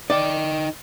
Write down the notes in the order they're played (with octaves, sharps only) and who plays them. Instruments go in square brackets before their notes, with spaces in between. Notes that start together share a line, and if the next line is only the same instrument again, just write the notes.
[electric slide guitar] D#4 D#5 G5 [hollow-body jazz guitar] D5